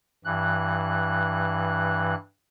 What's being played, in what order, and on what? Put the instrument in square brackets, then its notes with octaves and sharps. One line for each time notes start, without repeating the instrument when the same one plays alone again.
[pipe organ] G2 E3 F#6